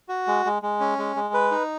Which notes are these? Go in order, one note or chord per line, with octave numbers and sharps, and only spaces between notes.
F#4
G#3
G#3
G#3
C#4
G#3
G#3
B4
D#4